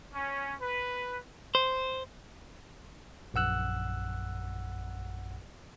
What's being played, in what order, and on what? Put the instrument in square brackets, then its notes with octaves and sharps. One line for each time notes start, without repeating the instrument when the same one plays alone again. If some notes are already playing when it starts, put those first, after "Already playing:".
[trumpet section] C#4
B4
[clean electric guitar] C5
[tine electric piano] A#1 F#2 F#5 E6 F#6